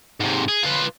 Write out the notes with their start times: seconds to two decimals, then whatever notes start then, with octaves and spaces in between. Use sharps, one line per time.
0.20 G#2 C3
0.48 G#4
0.63 F4 B4